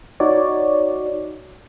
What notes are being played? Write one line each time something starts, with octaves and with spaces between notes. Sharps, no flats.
D#4 F#4 C#5 D5